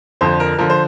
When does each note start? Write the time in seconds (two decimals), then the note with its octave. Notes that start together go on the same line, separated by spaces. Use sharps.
0.21 F2 D3 F3 C5
0.40 A#4
0.58 D3 F3 A#4
0.70 C5